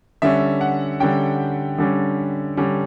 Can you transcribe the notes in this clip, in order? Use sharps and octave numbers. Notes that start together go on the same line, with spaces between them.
D3 G3 C#4 E5
F#5
D3 G3 C#4 G5
D3 G3 C#4
D3 G3 C#4